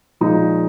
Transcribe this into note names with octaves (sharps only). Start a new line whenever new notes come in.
A#2 F3 G#3 D#4